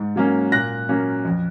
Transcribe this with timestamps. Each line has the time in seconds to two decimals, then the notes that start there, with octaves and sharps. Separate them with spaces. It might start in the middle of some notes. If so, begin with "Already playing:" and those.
Already playing: G#2
0.16 F#3 A#3 C#4
0.52 A#2 F#6 A#6
0.89 F#3 A#3 C#4
1.25 F2